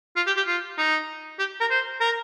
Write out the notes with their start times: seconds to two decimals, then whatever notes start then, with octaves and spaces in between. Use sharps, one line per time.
0.16 F4
0.27 G4
0.37 G4
0.47 F4
0.78 D#4
1.39 G4
1.60 A#4
1.70 C5
2.00 A#4